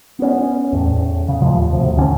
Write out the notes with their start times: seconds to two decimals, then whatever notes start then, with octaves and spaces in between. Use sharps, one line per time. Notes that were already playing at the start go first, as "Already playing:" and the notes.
0.19 B3 C#4
0.73 E2 A2
1.28 C#3
1.42 D#2 A2 F3
1.73 D2 C3
1.96 C#2 A2 D3 C#4